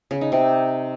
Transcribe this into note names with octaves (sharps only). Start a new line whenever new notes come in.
C#3
D#4
C3